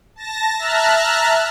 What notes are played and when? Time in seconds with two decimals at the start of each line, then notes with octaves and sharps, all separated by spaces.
0.16 A5 A#6
0.58 E5 A5 A#5 F6 F#6